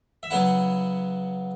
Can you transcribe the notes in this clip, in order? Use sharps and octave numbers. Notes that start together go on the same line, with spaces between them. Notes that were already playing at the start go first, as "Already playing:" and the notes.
E5
C#3 F#3 B3 E4 F#5